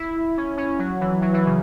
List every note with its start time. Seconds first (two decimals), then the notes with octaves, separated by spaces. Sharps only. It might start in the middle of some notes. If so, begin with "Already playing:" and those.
Already playing: E4
0.37 C#4
0.58 C#4
0.79 F#3
1.00 E3
1.22 F#3
1.33 E3
1.46 C#3